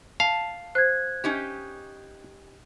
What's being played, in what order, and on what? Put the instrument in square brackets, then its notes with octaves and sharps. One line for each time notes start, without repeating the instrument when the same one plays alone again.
[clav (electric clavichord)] F5 [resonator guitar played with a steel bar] A5
[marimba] C5 [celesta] F#6 G#6
[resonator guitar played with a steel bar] C#4 D#4 G4